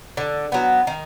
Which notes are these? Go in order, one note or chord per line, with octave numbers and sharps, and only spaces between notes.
D3
F#3 B3
D#3